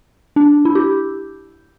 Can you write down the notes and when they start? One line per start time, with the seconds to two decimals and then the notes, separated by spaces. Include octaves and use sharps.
0.36 D4
0.65 E4
0.75 G4